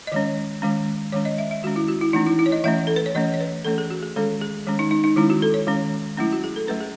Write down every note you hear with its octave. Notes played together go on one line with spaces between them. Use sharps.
D#5
D#3 G#3 C#4 C#5
D#3 G#3 C#4
D#3 G#3 C#4 C#5
D#5
E5
E5
D#3 G#3 C#4 F#4
E4
F#4
E4
E3 A3 C#4 D#4
E4
E4
C#5
D#5
E3 A3 C#4 E5
A4
B4
C#5
E3 A3 C#4 D#5
C#5
B4
E3 A3 C#4 A4
G#4
F#4
G#4
D#3 G#3 C#4 A4
G#4
D#3 G#3 C#4
D#4
D#4
D#4
D#3 G#3 C#4 E4
F#4
A4
C#5
D#3 G#3 C#4
F#3 A3 C#4 E4
F#4
G#4
A4
F#3 A3 C#4 B4
G#4